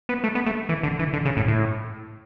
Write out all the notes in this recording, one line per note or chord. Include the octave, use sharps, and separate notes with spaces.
B3
A3
B3
A3
E3
D3
E3
D3
C#3
A2
A2